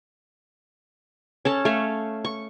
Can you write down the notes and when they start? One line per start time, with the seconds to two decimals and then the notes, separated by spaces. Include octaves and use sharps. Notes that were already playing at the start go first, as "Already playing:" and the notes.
1.45 C#4 A4 A5
1.65 A3 C#5 F5
2.25 C#6